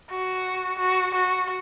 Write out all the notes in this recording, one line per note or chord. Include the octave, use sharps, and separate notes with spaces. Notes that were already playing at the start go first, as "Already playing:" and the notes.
F#4
F#4
F#4